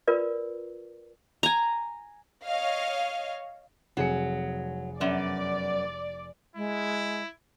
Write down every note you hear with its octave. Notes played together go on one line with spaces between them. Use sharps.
F4 A#4 B4 D5
G#5 A#5
C#5 D#5 F5
F1 F#3 G#4 C#7
F#2 B3 D5
G#3 E4